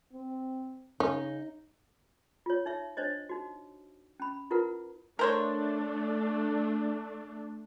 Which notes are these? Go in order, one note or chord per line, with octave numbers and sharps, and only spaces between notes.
C4
C#3 C#4 D#4
F4 C#5
D#4 C#5 E5
D4 C5 C#5 D#5
D#4 F#4
C#4 B5
E4 F4 A#4 B4 F#5
A3 D4 A#4 C5 C#5